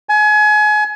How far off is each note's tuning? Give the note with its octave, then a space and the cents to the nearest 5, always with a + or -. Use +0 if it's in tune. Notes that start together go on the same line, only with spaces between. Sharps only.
G#5 +30